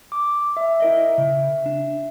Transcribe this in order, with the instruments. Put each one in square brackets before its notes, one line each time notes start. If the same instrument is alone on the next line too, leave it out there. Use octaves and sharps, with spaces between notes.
[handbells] D6
E5
[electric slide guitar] E4 A#4 D#5
C#3
D4